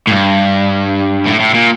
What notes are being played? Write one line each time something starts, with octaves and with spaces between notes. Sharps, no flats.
A2
G2
A2
A2
A#2